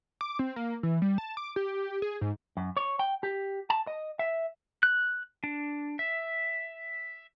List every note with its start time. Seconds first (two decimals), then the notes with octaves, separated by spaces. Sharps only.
0.21 D6
0.39 C4
0.56 A#3
0.83 E3
1.02 G3
1.18 A5
1.37 D6
1.56 G4
2.02 G#4
2.21 G#2
2.57 F#2
2.77 C#5
2.99 G5
3.23 G4
3.70 A5
3.87 D#5
4.19 E5
4.83 F#6
5.44 D4
5.99 E5